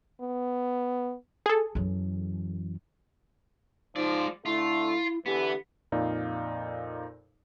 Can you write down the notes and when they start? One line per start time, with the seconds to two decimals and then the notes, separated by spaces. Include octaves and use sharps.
0.21 B3
1.46 G#4 A4
1.75 F#2 E3
3.96 F3 G#3 D#4 D5
4.46 D3 A3 E4 F4
5.26 D3 E3 B3 G4
5.92 F2 A#2 D#4 D5 F5